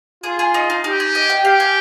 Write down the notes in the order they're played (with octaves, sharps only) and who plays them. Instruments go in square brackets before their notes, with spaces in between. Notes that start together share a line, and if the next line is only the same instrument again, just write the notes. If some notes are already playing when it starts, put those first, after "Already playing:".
[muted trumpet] F4 [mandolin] G#4
[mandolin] G#4
D#4
D#4
[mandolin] D#4 [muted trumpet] G4
[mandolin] G#4
D#5
G5
[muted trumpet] G4 [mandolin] F5
[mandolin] G#5